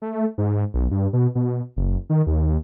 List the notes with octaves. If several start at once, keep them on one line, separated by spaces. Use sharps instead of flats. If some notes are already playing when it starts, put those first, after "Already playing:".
A3
G#2
B1
G2
B2
B2
F#1
D#3
D#2